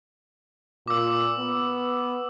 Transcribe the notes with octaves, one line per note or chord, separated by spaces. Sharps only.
A#2 D6 E6
B3